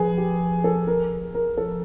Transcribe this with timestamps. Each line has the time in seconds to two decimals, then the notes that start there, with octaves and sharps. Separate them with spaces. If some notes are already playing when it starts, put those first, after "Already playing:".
Already playing: F3 G#4 B4
0.18 G4
0.64 A4
0.87 A#4
1.35 A#4
1.57 A4